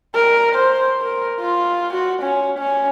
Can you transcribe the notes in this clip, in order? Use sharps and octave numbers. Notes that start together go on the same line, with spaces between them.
A#4
C5
A#4
F4
F#4
C#4
C#4